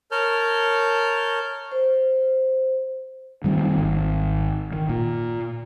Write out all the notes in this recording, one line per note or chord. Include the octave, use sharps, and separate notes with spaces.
A#4 C#5 A5 F6 G6
C5
D#3 G3 A3 C4
G#1
D#3
A#2